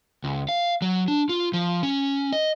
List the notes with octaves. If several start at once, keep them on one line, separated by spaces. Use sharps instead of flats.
C#2
F5
F#3
D4
F4
F3
C#4
D#5